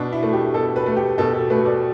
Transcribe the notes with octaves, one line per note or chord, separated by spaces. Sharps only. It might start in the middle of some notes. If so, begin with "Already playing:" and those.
Already playing: B2 D4
E4
A3
G4
B2 A4
B4
A3
G4
B2 A4
A4
A3 B4
D5